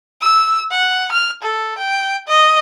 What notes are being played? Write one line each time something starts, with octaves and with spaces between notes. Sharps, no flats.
E6
F#5
F6
A4
G5
D#5